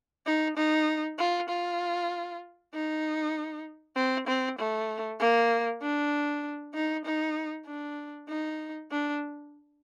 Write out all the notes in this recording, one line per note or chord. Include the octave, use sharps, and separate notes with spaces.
D#4
D#4
F4
F4
D#4
C4
C4
A3
A#3
D4
D#4
D#4
D4
D#4
D4